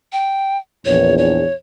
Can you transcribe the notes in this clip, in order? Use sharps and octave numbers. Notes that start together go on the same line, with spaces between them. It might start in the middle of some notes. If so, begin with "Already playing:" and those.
G5
A#1 E2 C#5
C#5